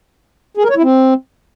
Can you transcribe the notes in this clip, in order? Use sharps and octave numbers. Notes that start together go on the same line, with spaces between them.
G#4
A#4
C#5
E4
C4